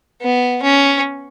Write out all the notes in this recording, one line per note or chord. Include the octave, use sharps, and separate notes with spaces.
B3
C#4